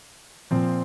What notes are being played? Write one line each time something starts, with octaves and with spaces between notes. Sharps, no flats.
A#2 F3 C4